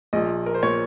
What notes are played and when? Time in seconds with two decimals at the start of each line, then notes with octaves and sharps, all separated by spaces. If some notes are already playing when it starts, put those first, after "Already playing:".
0.13 A#1 A#2 D#5
0.46 A#4
0.54 C5
0.63 A#2 C#5